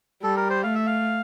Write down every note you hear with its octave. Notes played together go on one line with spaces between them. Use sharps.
G3 A4
A#4
C5
A3 F5
E5
F5